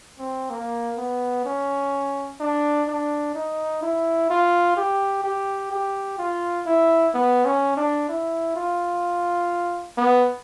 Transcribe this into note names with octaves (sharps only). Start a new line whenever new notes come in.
C4
A#3
B3
C#4
D4
D4
D#4
E4
F4
G4
G4
G4
F4
E4
B3
C#4
D4
E4
F4
B3